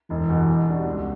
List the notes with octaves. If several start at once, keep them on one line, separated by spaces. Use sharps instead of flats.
E1 E3
E2 B2
B2
G3 D4 F#4
C#2